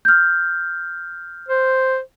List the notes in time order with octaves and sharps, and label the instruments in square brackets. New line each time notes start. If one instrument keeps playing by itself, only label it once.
[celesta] F6 G6
[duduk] C5